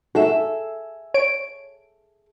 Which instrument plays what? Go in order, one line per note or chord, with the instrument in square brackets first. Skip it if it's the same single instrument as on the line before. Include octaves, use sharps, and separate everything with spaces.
[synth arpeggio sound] F#4 [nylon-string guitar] G#4 A4 E5
[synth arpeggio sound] C#5 D7